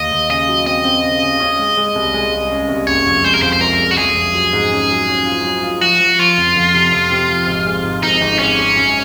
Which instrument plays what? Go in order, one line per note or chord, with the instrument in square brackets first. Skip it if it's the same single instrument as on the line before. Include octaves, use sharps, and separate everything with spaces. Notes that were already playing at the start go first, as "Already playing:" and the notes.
Already playing: [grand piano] D#2 [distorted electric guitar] D#5
[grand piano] D#2
[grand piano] C#3 [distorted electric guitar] D#5
[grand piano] F#3
[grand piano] C4 [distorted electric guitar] D#5
[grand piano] C4
C#3
C#3
C#4
G#3
G#3
C2
G#3
C2
C#4
C2
[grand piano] F#1 [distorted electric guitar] C#5
[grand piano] F2
[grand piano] G#3 [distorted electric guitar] C5
[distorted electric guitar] A#4
[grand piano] F2 [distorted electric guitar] C5
[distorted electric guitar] C5
[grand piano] F2 [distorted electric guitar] A#4
[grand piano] G#3
[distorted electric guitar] F#4
[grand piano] F2 [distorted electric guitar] G#4
[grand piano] F2
F#3
G#2
C#4
F#3
C#4
F4
F#3
F4
[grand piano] F3 [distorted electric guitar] F#4
[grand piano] F3
[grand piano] F3 [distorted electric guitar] F4
[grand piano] F2
F2
C3
F2
C3
F3
G#1
G#3
G#2
[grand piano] G#1 [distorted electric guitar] D#4
[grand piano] G#1
[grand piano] G#2 [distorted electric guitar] C#4
[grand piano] G#3
F#2